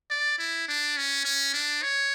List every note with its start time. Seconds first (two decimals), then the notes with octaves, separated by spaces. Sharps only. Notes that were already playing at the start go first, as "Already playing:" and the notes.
0.10 D5
0.39 E4
0.68 D4
0.97 C#4
1.25 C#4
1.54 D4
1.83 C#5